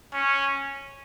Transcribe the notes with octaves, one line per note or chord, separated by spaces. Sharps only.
C#4